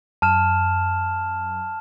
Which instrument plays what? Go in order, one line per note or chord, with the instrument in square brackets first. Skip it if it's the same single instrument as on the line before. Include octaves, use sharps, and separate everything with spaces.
[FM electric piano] F#2 [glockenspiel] A5 F6 E7